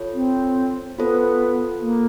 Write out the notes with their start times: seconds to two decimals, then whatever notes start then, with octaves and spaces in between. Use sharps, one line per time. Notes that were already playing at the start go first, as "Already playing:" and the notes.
Already playing: F4 A4 C#5
0.14 C4
0.98 B3 F4 A4 C5
1.82 A#3